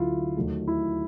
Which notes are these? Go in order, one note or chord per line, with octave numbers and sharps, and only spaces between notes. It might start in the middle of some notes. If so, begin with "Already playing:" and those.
Already playing: D2 D3 F#3 E4 F4
D#2 D#3 F#3 A3
E4